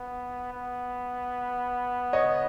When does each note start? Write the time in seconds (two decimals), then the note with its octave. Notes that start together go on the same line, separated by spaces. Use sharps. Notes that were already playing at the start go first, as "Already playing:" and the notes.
Already playing: B3
0.53 B3
2.13 C#5 D#5